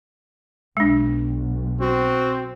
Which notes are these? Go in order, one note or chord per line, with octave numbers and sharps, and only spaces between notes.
B1 G#3 D4
C4 F#4